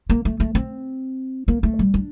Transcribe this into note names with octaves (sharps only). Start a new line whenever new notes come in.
A#3
A3
A3
C4
A#3
A3
G3
D4